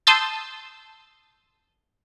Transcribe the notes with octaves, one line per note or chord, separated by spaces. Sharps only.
A5 C6 D#6 E6 G6 A6